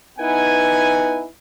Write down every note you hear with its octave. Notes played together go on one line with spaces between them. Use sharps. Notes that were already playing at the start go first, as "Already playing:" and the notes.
B3 D#4 E4 B4 F#5 G#5